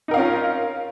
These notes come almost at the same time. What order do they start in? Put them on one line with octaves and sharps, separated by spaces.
D#4 A#4 F5 C#4 F4